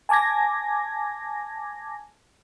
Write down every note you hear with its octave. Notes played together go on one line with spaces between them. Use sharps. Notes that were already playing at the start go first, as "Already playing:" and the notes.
G#5 A5 D6 G#6 A#6